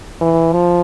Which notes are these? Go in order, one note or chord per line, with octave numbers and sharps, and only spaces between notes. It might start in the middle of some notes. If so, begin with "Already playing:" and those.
E3
F3